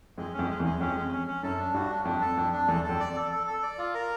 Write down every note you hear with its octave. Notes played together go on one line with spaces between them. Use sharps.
F2 G#3
F2 C#4
G#3
E2
G#3
F2 C#4
G#3
C#4
C#4
F#2 A4
D4
G2 F#4
D4
F2 D4
A4
F2 D4
D4
E2 A4
A4
F2
D5
A4
A4
A4
D5
F4
A#4